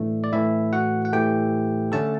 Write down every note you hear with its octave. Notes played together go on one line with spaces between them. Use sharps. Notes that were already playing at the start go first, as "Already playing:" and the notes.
Already playing: A2 E3 A3 D4
D5
A2 E3 A3 E4 E5
F#4 F#5
F#5
A2 E3 A3 G4 G5
D3 A3 C#4 A4 A5